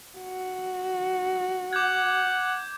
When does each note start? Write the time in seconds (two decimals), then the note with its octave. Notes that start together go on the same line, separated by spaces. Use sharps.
0.18 F#4
1.73 F#5 D6 G6 G#6